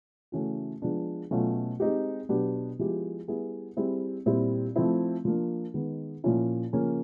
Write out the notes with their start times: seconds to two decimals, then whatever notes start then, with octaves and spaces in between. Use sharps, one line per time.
0.32 C#3 E3 A3 C#4 F#4
0.82 F3 G#3 B3 D4
1.31 B2 F#3 A3 C#4 F4
1.80 G#3 C4 D#4 G4
2.29 B2 F#3 B3 D4 G4
2.79 F3 G#3 B3 E4 G4
3.28 G3 B3 E4 G#4
3.77 G3 C4 E4 G#4
4.26 A#2 G3 C4 E4
4.76 F3 A3 C4 E4
5.25 F3 A#3 D4
5.74 D#3 G#3 B3
6.24 A#2 F3 A#3 C#4 E4
6.73 C#3 F3 A#3 C#4